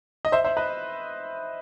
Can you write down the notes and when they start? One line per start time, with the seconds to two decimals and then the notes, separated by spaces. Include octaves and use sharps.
0.25 D#5
0.32 C5 E5
0.44 C5 E5
0.57 B4 D#5